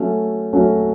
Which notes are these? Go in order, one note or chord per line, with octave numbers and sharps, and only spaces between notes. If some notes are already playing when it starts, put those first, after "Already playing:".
Already playing: F#3 A3 C#4
F#3 A3 C#4